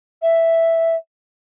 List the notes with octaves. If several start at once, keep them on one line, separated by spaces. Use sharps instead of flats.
E5